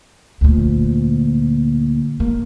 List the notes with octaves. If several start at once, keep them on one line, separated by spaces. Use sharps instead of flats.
D2 A#2
A#3